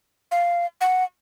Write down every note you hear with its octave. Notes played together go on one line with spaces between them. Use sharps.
F5
F#5